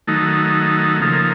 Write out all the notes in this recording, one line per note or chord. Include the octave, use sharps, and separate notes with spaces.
D#3 F#3 A3 D#4
C#3 F3 A#3 D#4 A4